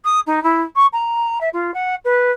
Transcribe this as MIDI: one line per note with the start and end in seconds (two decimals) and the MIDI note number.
0.05 0.20 87
0.27 0.42 63
0.43 0.63 64
0.76 0.87 85
0.93 1.39 82
1.41 1.49 76
1.53 1.74 65
1.74 1.95 78
2.05 2.31 71